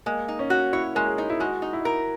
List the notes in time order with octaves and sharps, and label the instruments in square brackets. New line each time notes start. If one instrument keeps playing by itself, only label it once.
[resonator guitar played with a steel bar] G#3 [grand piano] A#3
[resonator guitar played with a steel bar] D#4
[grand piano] C#4
[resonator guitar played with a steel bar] F#4
[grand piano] E4 [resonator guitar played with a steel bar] C#5
[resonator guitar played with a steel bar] G#3 [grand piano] A#4
[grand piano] G#4
[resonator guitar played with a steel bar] D#4
[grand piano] E4
[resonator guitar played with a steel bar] G#3 [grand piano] F#4
[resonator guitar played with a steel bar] D#4
[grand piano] E4
[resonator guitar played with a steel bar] A#4